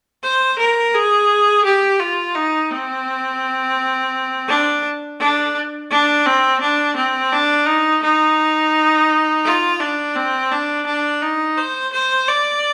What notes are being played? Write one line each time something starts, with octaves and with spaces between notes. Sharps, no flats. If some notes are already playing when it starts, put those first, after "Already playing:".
C5
A#4
G#4
G4
F4
D#4
C4
D4
D4
D4
C4
D4
C4
D4
D#4
D#4
F4
D4
C4
D4
D4
D#4
C5
C5
D5